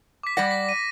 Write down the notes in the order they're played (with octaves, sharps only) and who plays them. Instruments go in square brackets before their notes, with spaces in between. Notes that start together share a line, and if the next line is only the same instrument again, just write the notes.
[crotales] D6 B6
[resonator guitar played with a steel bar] G3 D5 F#5 [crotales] A#6
[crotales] B6
D#7